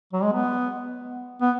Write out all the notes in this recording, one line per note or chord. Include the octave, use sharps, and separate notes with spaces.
F#3
G#3
B3
B3